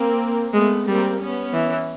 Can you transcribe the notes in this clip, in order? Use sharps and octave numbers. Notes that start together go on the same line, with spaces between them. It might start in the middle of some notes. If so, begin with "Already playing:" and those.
Already playing: A#3 C4
G#3 A3 B3
G3 A#3 C4
B3 C#4
E3